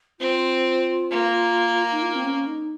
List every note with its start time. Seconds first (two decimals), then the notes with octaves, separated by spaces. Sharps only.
0.20 C4 F4
1.11 A#3
1.91 D#4
2.02 F4
2.15 C4
2.25 C#4
2.47 D#4